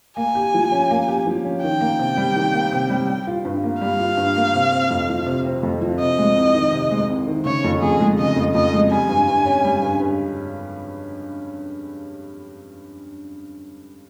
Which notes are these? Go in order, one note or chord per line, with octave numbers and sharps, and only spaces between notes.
A#3 G#5
G4
F3
C#4
A#3
G4
F3
C#4
D#3 G5
A#3
C3
G3
D#3
A#3
C3
G3
G3
F4
G2
A#3
G3 F5
F4
G2
A#3
C3
C4
F2
F3
C3
C4
F2
F3
C3 D#5
G#3
C2
D#3
C3
G#3
C2
D#3
C#3 C#5
F2
F2 G#4
G#3
C#3 D#5
F2
F2 D#5
G#3
G3 G#5
G2
G2
C#4
G3
G2
G2